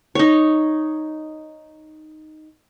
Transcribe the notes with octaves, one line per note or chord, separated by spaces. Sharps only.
D#4 C#5